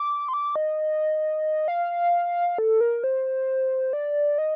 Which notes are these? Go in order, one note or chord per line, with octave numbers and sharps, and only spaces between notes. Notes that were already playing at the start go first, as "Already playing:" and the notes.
Already playing: D6
C6
D6
D#5
F5
A4
A#4
C5
D5
D#5